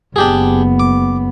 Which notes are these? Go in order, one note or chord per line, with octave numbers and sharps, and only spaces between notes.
F#1 B3 D4 G4 G#4
D6